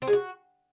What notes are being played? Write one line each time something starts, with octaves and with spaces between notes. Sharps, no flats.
C4
G#3
F#4